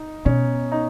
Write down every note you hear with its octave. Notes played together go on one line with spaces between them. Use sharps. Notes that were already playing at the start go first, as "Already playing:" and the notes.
Already playing: D#4
B2 C#4
D#4